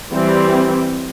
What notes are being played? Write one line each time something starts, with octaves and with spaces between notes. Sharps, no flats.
E3 G3 C4